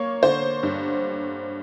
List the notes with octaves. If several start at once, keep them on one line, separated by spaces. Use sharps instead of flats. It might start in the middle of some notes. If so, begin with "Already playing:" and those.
Already playing: A#3 C#5
D3 C5
G2